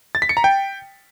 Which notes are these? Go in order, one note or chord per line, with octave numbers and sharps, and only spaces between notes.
A6
B6
C#7
A#5
G5